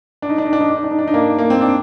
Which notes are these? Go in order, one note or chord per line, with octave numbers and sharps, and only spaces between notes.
D4
D#4
D4
D#4
D4
D#4
D4
D#4
D4
D#4
D4
D#4
A#3 D4
A#3
C4
D4